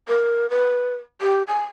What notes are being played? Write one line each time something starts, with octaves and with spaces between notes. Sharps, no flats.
A#4
B4
G4
G#5